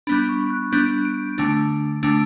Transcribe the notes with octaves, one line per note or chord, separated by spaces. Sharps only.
G3 B3 D4 B5
C#6
F#6
G3 B3 D4 G6
D7
D3 A3 D4
D3 A3 D4